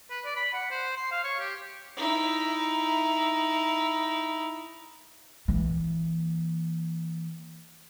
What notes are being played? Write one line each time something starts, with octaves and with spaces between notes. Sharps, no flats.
B4
D5
B5
F#5
C5
C6
F5
C#5
G4
D#4 E4
E3 A#3